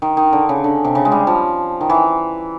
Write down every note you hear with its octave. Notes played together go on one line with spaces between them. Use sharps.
D#3
D#3
D3
C#3
D3
C3
C#3
G#3
G3
F3
D#3
E3